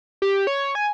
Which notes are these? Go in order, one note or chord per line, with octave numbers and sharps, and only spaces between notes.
G4
C#5
G#5